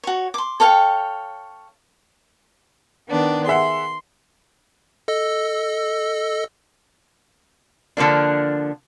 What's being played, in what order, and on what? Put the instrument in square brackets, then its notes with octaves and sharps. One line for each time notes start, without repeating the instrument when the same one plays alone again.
[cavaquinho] F#4 C#5
C6 D6
A4 C#5 F5 G5
[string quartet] D#3 B3 D4
[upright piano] G#4 E5 F#5 [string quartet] C6
[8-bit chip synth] A4 D#5 E6
[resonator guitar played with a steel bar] D3 F3 A#3 D4